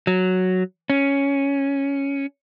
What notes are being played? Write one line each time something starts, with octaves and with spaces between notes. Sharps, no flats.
F#3
C#4